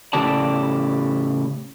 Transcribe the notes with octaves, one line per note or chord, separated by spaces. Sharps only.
A2 C#3 G4 D5 A5